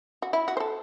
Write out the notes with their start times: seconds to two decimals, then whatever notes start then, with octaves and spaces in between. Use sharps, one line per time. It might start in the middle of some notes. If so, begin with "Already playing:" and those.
0.22 F#4
0.33 E4
0.48 F#4
0.57 C5
0.60 A4